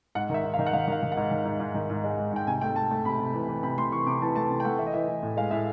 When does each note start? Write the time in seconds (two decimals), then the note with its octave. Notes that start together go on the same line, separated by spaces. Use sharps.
0.15 G#2 F#5
0.30 D#3 E5
0.44 G#2
0.54 F5
0.59 D#3
0.66 F#5
0.73 D#3 F5
0.88 D#3 F5
1.03 D#3
1.12 F#5
1.17 G#2
1.31 D#3
1.45 G#2
1.60 G#2
1.75 D#3
1.90 G#2
2.04 G#3
2.19 G#2
2.33 G#2 G5
2.47 C3 G#5
2.61 A3 G5
2.76 A3 A5
2.91 A3
3.05 C3 B5
3.19 C3
3.34 E3
3.49 E3
3.63 C3 B5
3.77 A3 C6
3.92 E3 C#6
4.06 C3 D6
4.22 E3 A5
4.35 A3 A5
4.50 C3
4.60 G5
4.65 A3 F#5
4.79 E3 E5
4.86 D#5
4.93 E3 E5
5.08 E3
5.23 A2
5.37 G#3 F5
5.51 A2 E5